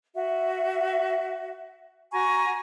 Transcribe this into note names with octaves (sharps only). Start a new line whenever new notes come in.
F#4 E5
F#4 G#5 A#5 C#6